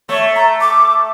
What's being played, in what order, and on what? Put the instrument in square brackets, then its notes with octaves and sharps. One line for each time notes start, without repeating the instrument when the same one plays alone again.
[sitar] A3 [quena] C#5
[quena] A#5
D6